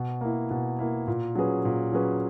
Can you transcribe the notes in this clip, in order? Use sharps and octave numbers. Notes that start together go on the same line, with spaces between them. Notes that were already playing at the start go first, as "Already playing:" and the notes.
Already playing: B2
A#3 E4
B2
A#3 E4
A#2
F#3 C#4 G#4 B4
A#2
F#3 C#4 G#4 B4